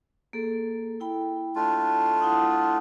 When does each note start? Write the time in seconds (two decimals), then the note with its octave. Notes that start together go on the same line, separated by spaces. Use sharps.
0.33 A#3 G#4 A4
1.00 E4 G5 B5
1.55 A3 D4 F4
2.20 E4 F#5 D#6